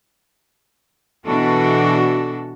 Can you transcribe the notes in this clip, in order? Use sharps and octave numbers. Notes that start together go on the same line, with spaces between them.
B2 E3 D4 F#4 A4